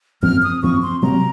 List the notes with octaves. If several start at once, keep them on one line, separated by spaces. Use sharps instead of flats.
F#2 F3 C4 F6
D#6
F#2 F3 C4 C#6
C6
C3 F#3 C4 A#5